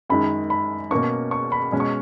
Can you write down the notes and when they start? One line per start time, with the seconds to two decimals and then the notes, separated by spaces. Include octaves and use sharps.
0.10 F#2 D#3 G#3 B5
0.50 B5
0.91 B2 A#3 C#4 C#6
1.31 C#6
1.52 B5
1.72 B2 G#3 C#4
1.80 C#6